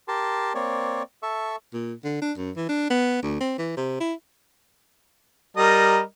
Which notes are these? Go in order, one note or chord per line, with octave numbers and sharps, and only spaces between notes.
G4 A#4 A5 C6
A#3 C4 C#5 D5
A4 E5 C#6
A#2
D3
D4
F#2
E3
D4
B3
D2
C4
E3
C3
E4
G3 A#4 D#5